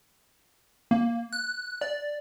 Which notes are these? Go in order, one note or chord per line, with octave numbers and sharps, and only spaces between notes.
A#3
F#6
D5